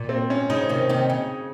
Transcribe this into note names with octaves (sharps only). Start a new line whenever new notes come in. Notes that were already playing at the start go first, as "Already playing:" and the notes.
Already playing: A#2
C4
C#4
C#3 F3 D#4
C3 D#3
C3 D#3
C#3